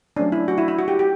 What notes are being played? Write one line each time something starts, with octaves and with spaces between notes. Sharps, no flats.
F#3 A3 C#4 D4
E4
F#4
E4
E4
F#4
G4
G4